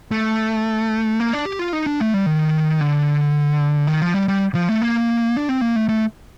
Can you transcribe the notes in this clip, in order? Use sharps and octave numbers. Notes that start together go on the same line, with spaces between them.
A3
A#3
D4
G4
F4
D#4
D4
A3
G3
D#3
D3
D#3
F3
G3
G3
F3
A3
A#3
D4
C4
A#3
A3
A3